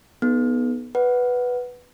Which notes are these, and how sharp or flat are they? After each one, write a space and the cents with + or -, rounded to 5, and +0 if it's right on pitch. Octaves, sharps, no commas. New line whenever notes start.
B3 -5 D#4 +0 G#4 +45
B4 +0 D5 +0 F#5 +0